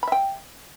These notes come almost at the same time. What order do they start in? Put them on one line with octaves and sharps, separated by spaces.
B5 E5 G5